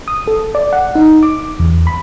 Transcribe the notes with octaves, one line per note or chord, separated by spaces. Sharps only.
D#6
A4
D5
F#5
D#4
D6
E2
B5